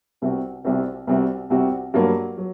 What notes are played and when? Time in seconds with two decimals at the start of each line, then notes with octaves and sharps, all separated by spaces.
0.22 C2 C3 G3 C4 F#4
0.65 C2 C3 G3 C4 F#4
1.07 C2 C3 G3 C4 F#4
1.50 C2 C3 G3 C4 F#4
1.94 G2 F#3 A#3 F#4
2.38 F#3